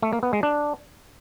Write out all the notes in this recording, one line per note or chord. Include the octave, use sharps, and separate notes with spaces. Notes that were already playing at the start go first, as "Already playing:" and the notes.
A3
A#3
B3
G#3
D4